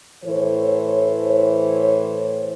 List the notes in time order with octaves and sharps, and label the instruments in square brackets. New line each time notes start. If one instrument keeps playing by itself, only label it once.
[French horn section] A2 E3 A4 C5 C#5